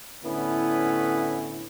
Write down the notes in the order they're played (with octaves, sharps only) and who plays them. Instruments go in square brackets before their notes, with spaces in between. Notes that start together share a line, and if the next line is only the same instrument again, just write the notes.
[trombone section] A2 D3 B3 C#4 E4